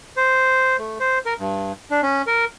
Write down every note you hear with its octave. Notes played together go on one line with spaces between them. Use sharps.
C5
A3
C5
A#4
G2
D4
C#4
A#4